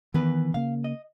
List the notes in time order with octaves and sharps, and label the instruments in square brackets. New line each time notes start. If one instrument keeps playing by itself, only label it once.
[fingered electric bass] D#3 [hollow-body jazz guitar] E3 B3 B4
[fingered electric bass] C#3 A#3 [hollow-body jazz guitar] F5
[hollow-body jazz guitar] D#5